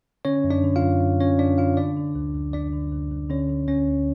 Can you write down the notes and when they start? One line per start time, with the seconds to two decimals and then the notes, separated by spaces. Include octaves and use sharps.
0.25 D3 C#4 C#5
0.44 F#2
0.50 D4 D5
0.64 D3
0.76 F4 F5
0.82 F#2
1.01 F#2
1.20 F#2 C#4 C#5
1.39 F#2 D4 D5
1.58 D3 F4 F5
1.77 D3 D4 D5
1.97 D3
2.15 D2
2.34 D2
2.53 D2 D4 D5
2.73 D3
2.91 D2
3.11 D2
3.30 D3 C#4 C#5
3.49 D3
3.68 D2 C#4 C#5
3.87 D2